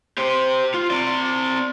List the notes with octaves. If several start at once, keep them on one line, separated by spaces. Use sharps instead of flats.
G4 C5
F4
C4 D5